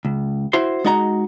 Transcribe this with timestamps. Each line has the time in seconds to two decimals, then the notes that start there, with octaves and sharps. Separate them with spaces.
0.05 C#2
0.53 E4 F#4 C5 C6
0.84 G#3 D#4 F#4 D#5 A#5